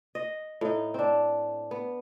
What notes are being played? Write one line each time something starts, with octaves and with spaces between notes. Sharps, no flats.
D#5
A2 D#4
C4 D4
B3